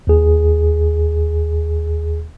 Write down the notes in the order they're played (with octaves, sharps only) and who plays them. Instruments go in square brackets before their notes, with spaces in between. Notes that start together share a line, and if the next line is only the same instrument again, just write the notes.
[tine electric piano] D#2 G#4